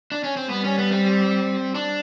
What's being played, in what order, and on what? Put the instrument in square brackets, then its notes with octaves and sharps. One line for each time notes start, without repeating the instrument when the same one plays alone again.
[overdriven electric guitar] D4
C#4
C4
[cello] G3 [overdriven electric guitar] B3
[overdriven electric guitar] C#4
B3
C4
D4